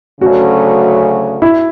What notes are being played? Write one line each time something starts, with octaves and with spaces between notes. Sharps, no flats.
D2 C#3 F#3 A3 C#4 F#4
E4